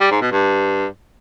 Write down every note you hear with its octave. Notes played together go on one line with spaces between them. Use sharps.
G3
G#2
B2
G2